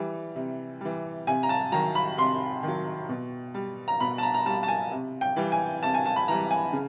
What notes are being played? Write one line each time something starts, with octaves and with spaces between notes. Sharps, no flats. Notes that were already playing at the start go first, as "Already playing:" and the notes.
Already playing: E3 G3
C3
E3 G3
C3 G#5
A#5
A5
D#3 F#3 A#5
B5
C3 C6
D#3 F#3
B2
G3
A#5
B2 B5
A5
A#5
A#5
G3 A5
A5
G#5
C3
G5
E3 G3
G#5
C3 A5
G#5
A5
B5
E3 G3 A#5
G#5
C#3